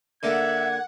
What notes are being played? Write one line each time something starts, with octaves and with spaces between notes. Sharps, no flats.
D3 A#3 E5 F#5 G#6